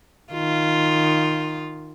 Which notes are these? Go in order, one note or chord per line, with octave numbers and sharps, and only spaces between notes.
D#3 F4